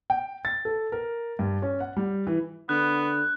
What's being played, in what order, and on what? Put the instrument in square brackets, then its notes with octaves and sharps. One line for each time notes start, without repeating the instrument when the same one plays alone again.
[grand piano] G5
A6
A4
A#4
G2
C#4
F#5
G3
E3
[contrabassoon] D3 [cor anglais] B3 [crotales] F#6